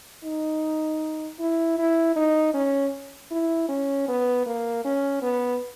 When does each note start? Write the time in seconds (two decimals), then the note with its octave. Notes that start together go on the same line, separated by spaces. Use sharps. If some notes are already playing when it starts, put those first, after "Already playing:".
0.25 D#4
1.39 E4
1.78 E4
2.16 D#4
2.54 C#4
3.32 E4
3.69 C#4
4.08 B3
4.46 A#3
4.85 C#4
5.22 B3